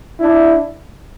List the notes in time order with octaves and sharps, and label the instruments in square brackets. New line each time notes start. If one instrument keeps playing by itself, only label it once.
[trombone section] D4 E4